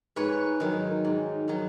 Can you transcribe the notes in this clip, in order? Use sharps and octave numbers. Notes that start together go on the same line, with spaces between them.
G#2 B4 C#5
D#3 F#3
G#2
D#3 F#3